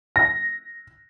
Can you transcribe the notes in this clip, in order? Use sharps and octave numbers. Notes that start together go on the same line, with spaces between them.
A#6